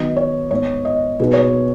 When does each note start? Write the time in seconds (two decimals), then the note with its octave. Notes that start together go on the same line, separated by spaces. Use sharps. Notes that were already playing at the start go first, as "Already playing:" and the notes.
Already playing: D#3 F#3 B3 D#5
0.17 C#5
0.51 G#2 G#3 B3 C#5
0.85 D#5
1.20 B2 F#3 D#4 G#4 B4
1.33 C#5
1.43 B4